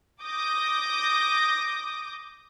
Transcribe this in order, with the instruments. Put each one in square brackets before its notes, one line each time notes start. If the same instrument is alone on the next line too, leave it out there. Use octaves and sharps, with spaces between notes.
[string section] D6 D#6 G6 A#6